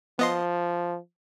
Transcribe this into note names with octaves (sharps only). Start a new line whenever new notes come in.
F3 B3 D#5 C6